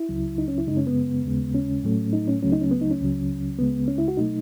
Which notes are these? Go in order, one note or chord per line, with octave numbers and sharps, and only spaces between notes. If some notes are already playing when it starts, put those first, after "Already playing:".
Already playing: E4
C#2 C#3 F#3
D#4
C#4
E4
F#2 C#3 G#3 D#4
C#4
B3
D#2 C#3 G#3
C#4
A2 F#3 A3
D#4
C#4
C#2 C#3 F#3 A3 C#4
D#4
C#4
B3
D#4
C#4
C#2 C#3 F#3
C#2 C#3 G#3 B3
C#4
E4
F#4
B2 F#3 A3 D#4